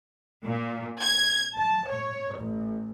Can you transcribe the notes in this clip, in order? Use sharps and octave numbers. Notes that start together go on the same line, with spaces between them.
A#2
G#6
A5
C#5
A1